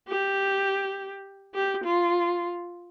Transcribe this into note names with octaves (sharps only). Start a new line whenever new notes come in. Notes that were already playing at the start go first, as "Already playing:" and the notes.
G4
G4
F4